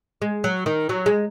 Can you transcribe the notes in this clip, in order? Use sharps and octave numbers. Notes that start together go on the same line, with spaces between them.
G#3
F#3
D#3
F#3
G#3